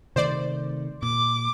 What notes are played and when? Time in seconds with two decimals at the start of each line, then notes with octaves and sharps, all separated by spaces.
0.16 C3 D#3 A3 C5 D5
1.03 A#2 D6